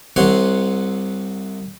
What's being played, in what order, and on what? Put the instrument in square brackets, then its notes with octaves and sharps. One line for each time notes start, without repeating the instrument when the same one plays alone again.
[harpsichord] C2 C3 C#5 F#5 C6